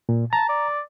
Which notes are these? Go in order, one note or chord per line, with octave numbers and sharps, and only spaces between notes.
A#2
A5 A#5
D5